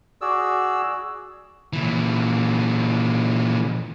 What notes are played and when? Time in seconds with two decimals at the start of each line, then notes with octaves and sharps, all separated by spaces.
0.21 F#4 G#4 D5 E6
1.73 A#2 E3